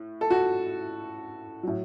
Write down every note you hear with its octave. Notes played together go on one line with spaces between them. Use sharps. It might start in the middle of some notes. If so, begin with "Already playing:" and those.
Already playing: A2
A4
F#4
A2 F#3